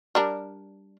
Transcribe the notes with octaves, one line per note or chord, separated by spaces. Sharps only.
G3 D4 A#4